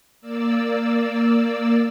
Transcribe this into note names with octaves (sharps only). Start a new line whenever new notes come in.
A#3 D5 E6